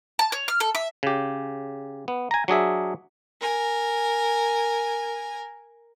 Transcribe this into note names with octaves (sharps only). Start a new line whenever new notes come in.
A5
C#5
F6
A4
E5
C#3 G4
B3
G#5 A#5
F#3 D4 G#4 E5
A#4 G#5